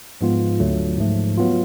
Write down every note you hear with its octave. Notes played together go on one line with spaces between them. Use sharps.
G#2 F3 G#3 B3 F4
D2 D3 F#3 A3
G#2 F3 A3
F#3 B3 F4